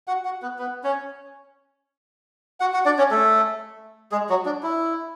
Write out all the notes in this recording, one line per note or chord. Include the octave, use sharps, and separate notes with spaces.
F#4 F#5
F#4 F#5
B3 B4
B3 B4
C#4 C#5
F#4 F#5
F#4 F#5
D4 D5
C#4 C#5
A3 A4
G#3 G#4
F#3 F#4
D4
E4